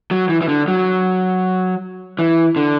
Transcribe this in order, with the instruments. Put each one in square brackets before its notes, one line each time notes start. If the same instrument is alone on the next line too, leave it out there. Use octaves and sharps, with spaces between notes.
[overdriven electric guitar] F#3
E3
E3
D3
F#3
E3
D3